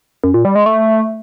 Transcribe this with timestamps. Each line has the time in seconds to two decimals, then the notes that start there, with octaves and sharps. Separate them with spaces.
0.24 F#2
0.34 A#2
0.45 G3
0.55 G#3
0.66 A3